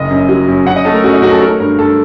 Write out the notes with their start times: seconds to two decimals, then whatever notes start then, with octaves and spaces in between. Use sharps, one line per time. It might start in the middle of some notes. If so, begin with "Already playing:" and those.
Already playing: F#1 D#5
0.10 F#2
0.29 F#3
0.48 F#2
0.66 F#2 F#5
0.76 D#5
0.85 A3 A4
0.95 A#4
1.04 F#2 F#4
1.14 D#4
1.22 F#2 F#4
1.31 A4
1.41 A3 A#4
1.60 G2 A#4
1.78 G2 A4